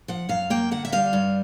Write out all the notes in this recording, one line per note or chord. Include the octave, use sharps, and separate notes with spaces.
F3 F#5
F#2 F5
A#3 G5
D3 F#5
E5
G3 F5
G2